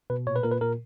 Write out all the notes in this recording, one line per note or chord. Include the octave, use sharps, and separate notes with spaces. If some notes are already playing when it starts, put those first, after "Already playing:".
B2 B4
A#2 C#5
B4
A#2 A#4
B4
A#2 A#4